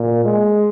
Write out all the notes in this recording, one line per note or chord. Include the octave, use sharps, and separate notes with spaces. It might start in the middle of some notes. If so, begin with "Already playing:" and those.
Already playing: A#2
G#3